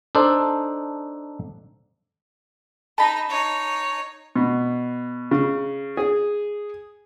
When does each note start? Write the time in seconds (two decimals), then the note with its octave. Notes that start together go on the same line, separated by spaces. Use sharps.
0.15 D4 D#4 A4 C5
2.98 D#4 D#5 A5 B5
3.30 D#4 C#5
4.36 B2
5.31 C#3
5.97 G#4